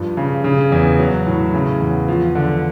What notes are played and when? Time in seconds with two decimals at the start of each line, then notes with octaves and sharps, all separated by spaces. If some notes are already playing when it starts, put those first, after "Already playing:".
Already playing: G2 F3
0.17 C#3
0.44 C#3
0.72 E2
0.99 F#3
1.27 A2
1.54 C#3
1.81 E2
2.08 F3
2.35 D3